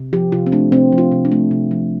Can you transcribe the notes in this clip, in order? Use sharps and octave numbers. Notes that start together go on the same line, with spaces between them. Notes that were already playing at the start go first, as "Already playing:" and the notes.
Already playing: C3
F3 G4
C3 F4
C4
A3 D4
C3 C4
F3
F4
C3
D4
A3
C3
F3